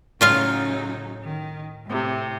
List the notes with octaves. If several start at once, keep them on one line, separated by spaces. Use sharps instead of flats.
A2 C#3 F#3 D#4 F4 F5
D#3
A2 C3